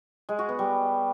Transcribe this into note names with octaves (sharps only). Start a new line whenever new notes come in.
G#3
F#4
B3
G3